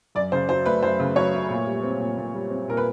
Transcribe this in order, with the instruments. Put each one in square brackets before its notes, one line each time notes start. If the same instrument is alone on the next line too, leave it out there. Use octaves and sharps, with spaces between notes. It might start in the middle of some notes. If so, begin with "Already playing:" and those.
[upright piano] F#2 D5
C#3 C5
F#3 C5
A3 B4
F#2 C5
C#3
F#3 C#5
A3
A#2
G3
C4
A#2
A#2
G3
C4
A#2 A#4
B4